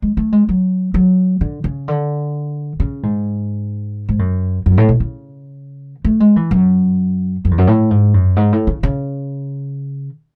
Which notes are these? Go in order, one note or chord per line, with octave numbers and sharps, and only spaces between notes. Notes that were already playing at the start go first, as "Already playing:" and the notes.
G#3
A3
G#3
F#3
F#3
D3
C#3
D3
C#3
G#2
G#2
F#2
F#2
A2
B2
C#3
A3
G#3
E3
F#2
F#2
E2
F#2
A2
G#2
F#2
G#2
A2
C#3
C#3